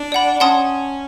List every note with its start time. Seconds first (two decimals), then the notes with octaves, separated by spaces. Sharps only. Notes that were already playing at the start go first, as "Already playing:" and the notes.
Already playing: D4
0.12 D5 F#5 B5
0.36 D4
0.40 C#4 F#5 A5 C6 D#6